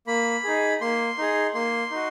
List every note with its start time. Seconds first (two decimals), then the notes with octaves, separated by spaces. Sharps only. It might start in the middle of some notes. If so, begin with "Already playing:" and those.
0.07 A#3 B5
0.44 D#4 G#4
0.81 A#3 C6
1.18 D#4 G#4
1.54 A#3 C6
1.91 D#4 F#4